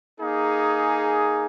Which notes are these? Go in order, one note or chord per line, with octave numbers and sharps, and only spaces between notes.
A#3 D#4 G#4